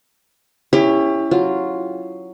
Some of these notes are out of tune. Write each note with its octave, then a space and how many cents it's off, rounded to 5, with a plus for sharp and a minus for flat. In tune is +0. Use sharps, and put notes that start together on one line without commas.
C#4 +0 E4 +0 G4 +30
F#3 +0 F4 +0